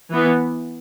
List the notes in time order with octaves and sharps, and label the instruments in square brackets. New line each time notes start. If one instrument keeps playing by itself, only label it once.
[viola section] E3 B3